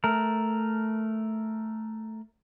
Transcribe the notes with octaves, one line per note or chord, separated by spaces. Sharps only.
A3 A#4